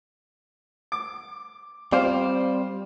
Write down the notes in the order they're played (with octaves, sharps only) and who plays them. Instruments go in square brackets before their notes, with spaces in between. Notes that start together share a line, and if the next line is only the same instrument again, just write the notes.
[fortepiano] D6
[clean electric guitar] G3 C4 D5 [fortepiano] F4 C5 F5